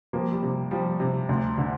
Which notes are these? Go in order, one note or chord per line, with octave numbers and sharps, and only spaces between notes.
F3 G3 A#3
G3
C3
F3 G3
C3
D2
D3